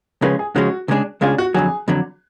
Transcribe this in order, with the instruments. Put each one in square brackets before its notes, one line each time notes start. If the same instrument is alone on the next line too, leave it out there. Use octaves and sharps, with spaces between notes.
[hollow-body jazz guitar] C#3 F3 G#3 C#4 [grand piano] B4
[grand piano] G#4
[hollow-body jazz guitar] C#3 F3 G#3 C#4 [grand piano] F#4
[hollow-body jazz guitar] C#2 C#3 G#3 D4 G#4
[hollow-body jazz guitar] C#2 C#3 G#3 D4 G#4 [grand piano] F4
[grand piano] F#4
[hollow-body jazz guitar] F2 D3 F#3 [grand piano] G#4
[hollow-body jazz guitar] F2 D3 F#3